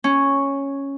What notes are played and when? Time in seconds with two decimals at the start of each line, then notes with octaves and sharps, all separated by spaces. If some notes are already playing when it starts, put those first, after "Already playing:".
0.04 C#4